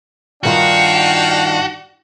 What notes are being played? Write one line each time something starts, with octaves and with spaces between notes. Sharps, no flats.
G2 D#3 D4 F4 F#4 F5 G5